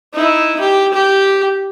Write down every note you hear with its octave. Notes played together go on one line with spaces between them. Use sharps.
D#4 E4
G4
G4